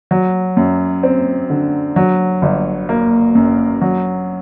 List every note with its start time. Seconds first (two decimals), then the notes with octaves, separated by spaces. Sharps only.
0.11 F#3
0.57 F#2
1.03 C4
1.50 D3
1.96 F#3
2.42 G1
2.89 A#3
3.35 F#2
3.81 F#3